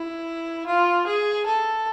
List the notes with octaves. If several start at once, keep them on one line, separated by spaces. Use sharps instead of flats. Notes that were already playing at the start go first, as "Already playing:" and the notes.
Already playing: E4
F4
G#4
A4